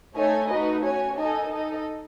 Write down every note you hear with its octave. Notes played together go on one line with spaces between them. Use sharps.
A3 D#4 A4 C#5 G#5
A3 D#4 F#4 B4 D#5
C#4 F#4 C#5 G#5
D#4 A4 D#5 G#5
D#4 A4 D#5